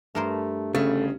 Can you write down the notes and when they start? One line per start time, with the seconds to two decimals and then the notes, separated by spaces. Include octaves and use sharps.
0.15 G2 A3 A#4 C5
0.75 G1 C#3 A3